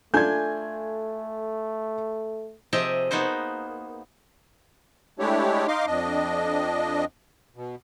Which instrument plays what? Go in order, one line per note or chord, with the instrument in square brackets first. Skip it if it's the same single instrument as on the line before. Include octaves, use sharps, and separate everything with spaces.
[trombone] A3 [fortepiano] D4 F4 G#5 [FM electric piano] A4 [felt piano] G6 G#6
[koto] C3 F3 G4 G#4 D#5 E5
A#3 B3 D#4 F#4 C5
[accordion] G#3 A3 D4 E4 G4 C#5
D#4 D#5 F5 C6 D6
F2 D4 D#5
B2